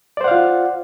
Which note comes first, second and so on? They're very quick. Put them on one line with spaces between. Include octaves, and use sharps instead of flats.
D5 C5 F#5 F5 F4